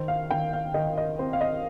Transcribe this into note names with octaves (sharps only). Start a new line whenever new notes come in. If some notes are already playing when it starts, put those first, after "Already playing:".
Already playing: D#3 C5
F5
D#3 G5
F5
D#3 D#5
D#5
C4 C5
F5
D#5